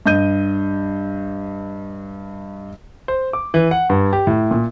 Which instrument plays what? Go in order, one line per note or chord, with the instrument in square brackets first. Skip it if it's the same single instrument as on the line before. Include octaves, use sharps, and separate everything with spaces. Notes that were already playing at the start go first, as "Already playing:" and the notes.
[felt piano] G2 D#5 G6 D#7
[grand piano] C5
D6
E3
F#5
G2
G4
A2
A#2